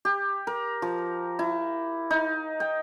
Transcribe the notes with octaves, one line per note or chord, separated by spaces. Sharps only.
G4
A#4
F3
E4
D#4
G5